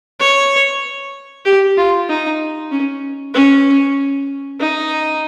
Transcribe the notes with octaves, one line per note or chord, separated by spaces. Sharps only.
C#5
G4
F4
D#4
C#4
C#4
D#4